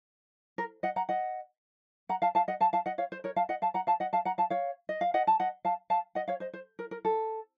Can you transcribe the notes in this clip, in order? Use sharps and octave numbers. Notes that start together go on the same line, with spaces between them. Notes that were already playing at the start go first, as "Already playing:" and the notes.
A#4
D#5 F#5
F#5 A#5
D#5 F#5
F#5 A#5
F5 A5
F5 A5
D#5 F#5
F5 A5
F5 A5
D#5 F#5
C#5 F5
C5
A#4 C#5
F5 A5
D#5 F#5
F5 A5
F#5 A#5
F5 A5
D#5 F#5
F5 A5
F#5 A#5
F5 A5
C#5 F5
D#5
F5
D#5 F#5
A5
D#5 F#5
F5 A5
F5 A5
D#5 F#5
C#5 F5
C5 D#5
C5
A#4
A#4
A4